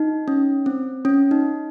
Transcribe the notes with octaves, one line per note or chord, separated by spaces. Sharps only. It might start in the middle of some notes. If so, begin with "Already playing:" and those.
Already playing: D#4
C#4
C4
C#4
D#4